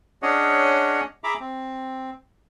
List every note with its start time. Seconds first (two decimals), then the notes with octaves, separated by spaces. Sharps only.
0.22 C#4 D4 G#4 C#5 D#5 F#5
1.24 G#4 E5 A#5 B5 D6
1.40 C4